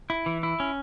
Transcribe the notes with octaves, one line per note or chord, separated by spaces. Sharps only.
E4
E3
E4
C#4